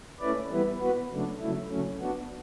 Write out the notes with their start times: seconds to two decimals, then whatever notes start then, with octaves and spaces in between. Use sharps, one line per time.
0.20 A3 C#4 E4 B4 D5
0.49 E3 G3 B3 E4 B4
0.80 B3 F#4 B4
1.10 C#3 F#3 A3 D4
1.40 C#3 F#3 A3 E4
1.69 C#3 F#3 A3 C#4
2.00 B3 D4 F#4